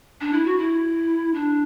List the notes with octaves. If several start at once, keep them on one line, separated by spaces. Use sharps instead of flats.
D4
E4
F#4
E4
D4